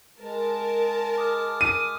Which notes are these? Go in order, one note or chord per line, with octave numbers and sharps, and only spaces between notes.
G#3 A#4 A5
D6 D#6 F6
D#7